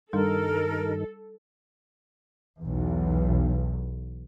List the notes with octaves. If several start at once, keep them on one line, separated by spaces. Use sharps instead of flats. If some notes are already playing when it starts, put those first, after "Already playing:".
G2 D#3 G3 D4 A4 A#4
B1 E2